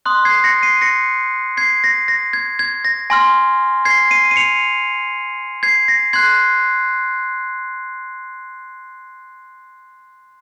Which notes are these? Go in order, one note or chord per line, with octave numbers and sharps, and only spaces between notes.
C6 D#6 F#6
G#6 C7
A#6 C#7
C7 D#7
A#6 C#7
G#6 C7
A#6
A#6
G#6
G#6
A#6
G#5 C6 F6 A#6
G#6 C7
C7 D#7
D#7
C#7 F7
G#6 C7
A#6
C6 F#6 G#6 C7